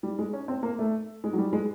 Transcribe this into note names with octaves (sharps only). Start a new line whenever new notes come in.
G3
G#3
C#4
C4
A#3
A3
G#3
F#3
G3
G#3